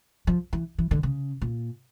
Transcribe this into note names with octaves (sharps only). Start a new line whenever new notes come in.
F3
E3
E3
D3
C#3
A#2